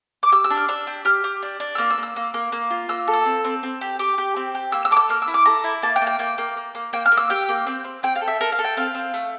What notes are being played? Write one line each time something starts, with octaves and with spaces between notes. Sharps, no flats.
D6
G4 E6
E6
D4
F6
D4 E6
G4
G4 F6
G4
D4
D4
E6
A#3 F6
E6
A#3
E6
A#3
A#3
A#3
F4
A#3 E6
A4
E6
C4
C4
C4
G4
G4 D6
G4
C4
G4
A#3 E6
E6
A4 D6
E6
A#3 F6
E6
E4
D6
A4 A#5
E4
A#3 A5
G5
A#3
G5
A#3 G5
A#3
A#3
A#3
A#3 G5
F6
A#3
E6
G4 G5
A#3
C4
C4
C4 G5
F5
A4
E5
A4 A#4
F5
A4
G5
C4 F5
C4
A3